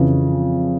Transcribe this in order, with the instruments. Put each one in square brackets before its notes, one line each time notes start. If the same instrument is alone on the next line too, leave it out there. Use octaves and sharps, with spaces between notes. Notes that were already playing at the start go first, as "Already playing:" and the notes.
Already playing: [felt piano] F2 C#3 E3